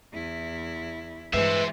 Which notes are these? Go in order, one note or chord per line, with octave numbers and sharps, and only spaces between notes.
E2 E4
G2 E3 G#3 B4 C5 E5